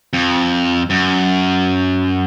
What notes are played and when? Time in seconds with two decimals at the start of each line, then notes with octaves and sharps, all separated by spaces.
0.13 F2
0.90 F#2